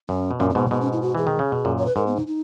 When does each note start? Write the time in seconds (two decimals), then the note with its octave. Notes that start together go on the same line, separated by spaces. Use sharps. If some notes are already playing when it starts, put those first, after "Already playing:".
0.09 F#2 C#4
0.31 B2
0.40 F#2 A#2 C#4
0.50 C#4
0.55 G#2 B2 B3
0.66 A#3
0.71 G#2 B2 B3
0.81 C#4
0.93 E4
1.02 F#4
1.15 E3 G#4
1.27 D#3
1.39 C#3
1.52 B2
1.65 F#2 A#2
1.78 C#5
1.86 B4
1.96 G#2 A#4
2.07 B3
2.16 D#4
2.27 D#4